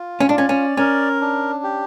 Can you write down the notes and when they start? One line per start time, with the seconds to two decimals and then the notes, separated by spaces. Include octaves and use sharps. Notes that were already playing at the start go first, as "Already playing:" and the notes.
Already playing: F4
0.20 C#4
0.29 D4
0.35 C#4 D5
0.49 C#4
0.77 C#4 A#4
1.21 D4
1.64 G4